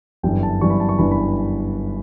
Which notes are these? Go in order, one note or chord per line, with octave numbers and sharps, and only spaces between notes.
G1 F#2 E3 G3 D4 G5
A5
G1 F#2 E3 G3 D4 C#6
B5
A5
C#6
G1 F#2 E3 G3 D4 B5
B5